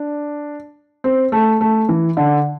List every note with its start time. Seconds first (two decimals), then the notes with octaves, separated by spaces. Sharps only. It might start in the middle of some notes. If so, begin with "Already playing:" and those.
Already playing: D4
1.04 C4
1.32 A3
1.61 A3
1.89 E3
2.17 D3